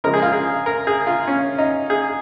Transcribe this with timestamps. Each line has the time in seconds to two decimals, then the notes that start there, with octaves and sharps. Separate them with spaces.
0.04 C#3 F3 G#3 A#4
0.14 G#4
0.22 F4
0.33 G#4
0.66 A#4
0.87 G#4
1.07 F4
1.28 C#4
1.58 D#4
1.90 G#4